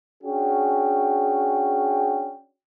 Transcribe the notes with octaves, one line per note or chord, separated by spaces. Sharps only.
C#4 D4 F#4 G#4 G5